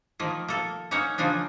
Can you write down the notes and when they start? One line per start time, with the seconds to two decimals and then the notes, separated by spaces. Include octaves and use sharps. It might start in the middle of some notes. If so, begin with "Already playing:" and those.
0.19 D#3 F3 A#3
0.48 A#3 A4
0.91 A#3 C#4 D#4 C#5 F#5
1.18 C#3 F3 A#3 D4 D#4